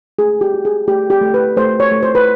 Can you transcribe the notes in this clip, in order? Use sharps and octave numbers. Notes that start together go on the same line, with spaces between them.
A3 G#4
G4
F#4
G#4
A3 G4
G4
A3
B4
A3 C5
C#5
A3
C5
B4